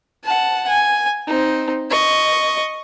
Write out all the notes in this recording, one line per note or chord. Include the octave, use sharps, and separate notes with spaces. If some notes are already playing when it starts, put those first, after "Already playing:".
F#5 A5
G#5
C4 D#4
D#5 C#6